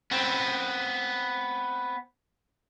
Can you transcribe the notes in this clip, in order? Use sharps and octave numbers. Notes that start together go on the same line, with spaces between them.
B3 C4